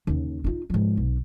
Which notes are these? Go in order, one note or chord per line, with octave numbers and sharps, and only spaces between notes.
D#2 C#3
D#4 F4
G#2 F3
B1